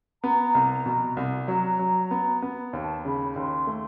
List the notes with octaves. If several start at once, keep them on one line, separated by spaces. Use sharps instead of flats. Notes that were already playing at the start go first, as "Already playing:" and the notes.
B3 A#5
C2
B2
C2
F#3 A#5
F#3
B3
B3
D#2 A5
C#3 B5
D#2 C6
A3